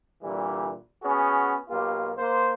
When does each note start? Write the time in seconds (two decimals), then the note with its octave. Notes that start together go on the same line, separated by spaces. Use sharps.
0.23 A#2 D3 E3 G3
1.03 B3 C#4 F#4 G#4
1.70 B1 A#3 F4 G4
2.18 A#3 C5